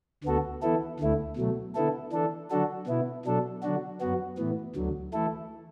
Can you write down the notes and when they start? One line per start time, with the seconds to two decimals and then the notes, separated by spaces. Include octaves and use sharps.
0.24 D2 D3 B3 F#4 A4
0.62 E3 B3 E4 A4
1.00 D2 D3 A3 E4
1.36 B2 F#3 A3
1.75 D3 B3 E4 A4
2.12 E3 D4 A4
2.50 D3 F#3 D4 F#4 A4
2.87 B2 B3 E4
3.25 B2 F#3 D4 A4
3.62 D3 F#3 D4 F#4
4.00 F#2 F#3 B3 F#4
4.38 A2 E3 B3
4.76 D2 D3 F#3
5.13 E3 A3 E4 A4